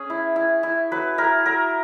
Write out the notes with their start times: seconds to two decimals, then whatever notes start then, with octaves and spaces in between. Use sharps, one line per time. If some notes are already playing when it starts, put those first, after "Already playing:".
Already playing: C#4 G#4
0.10 E4
0.36 E4
0.63 E4
0.92 F#3 B4
1.18 E4 A#4
1.45 F#3 A#4